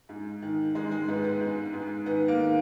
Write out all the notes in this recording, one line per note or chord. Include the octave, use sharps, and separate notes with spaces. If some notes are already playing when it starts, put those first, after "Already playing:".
G#2
D#3
G#2 G#3
G#3
G#2 B3
B3
G#2
G#2
D#3 B3
A#3
D#3